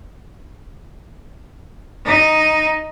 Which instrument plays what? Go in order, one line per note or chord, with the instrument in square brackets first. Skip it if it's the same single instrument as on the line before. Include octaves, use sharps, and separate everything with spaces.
[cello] D#4